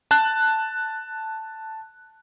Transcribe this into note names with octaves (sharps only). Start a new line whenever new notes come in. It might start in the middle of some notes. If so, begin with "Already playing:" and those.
A5 F#6